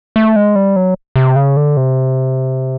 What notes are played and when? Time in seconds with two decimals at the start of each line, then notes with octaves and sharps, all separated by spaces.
0.16 A3
0.36 G#3
0.56 G3
0.76 F#3
1.16 C3
1.36 C#3
1.57 D3
1.77 C3